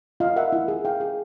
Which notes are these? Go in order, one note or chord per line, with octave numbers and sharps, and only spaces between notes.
F4 D#5 F5
A#4 E5 F#5
E4
G#4
E4 F5 G5
G#4